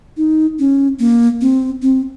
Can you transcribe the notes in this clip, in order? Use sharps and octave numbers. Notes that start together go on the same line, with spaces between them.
D#4
C#4
A#3
C4
C4